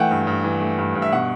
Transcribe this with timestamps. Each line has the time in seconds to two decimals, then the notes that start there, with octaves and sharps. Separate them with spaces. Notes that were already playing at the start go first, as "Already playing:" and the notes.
Already playing: E3 A3 F#5 G5
0.11 G2
0.27 G2
0.44 E3
0.61 A3
0.78 G2
0.95 G2
1.02 E5
1.12 B2 F#5